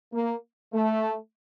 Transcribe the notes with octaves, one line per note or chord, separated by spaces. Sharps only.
A#3
A3